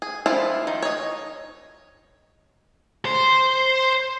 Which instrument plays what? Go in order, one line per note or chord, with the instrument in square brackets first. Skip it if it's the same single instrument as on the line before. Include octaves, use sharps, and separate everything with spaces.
[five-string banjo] G#4
F3 D4 E4 F4
D#3
C#5 D#5
[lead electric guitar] C5